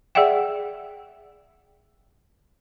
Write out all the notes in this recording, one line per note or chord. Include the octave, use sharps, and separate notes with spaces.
G#4 D5 E5 F#5 G5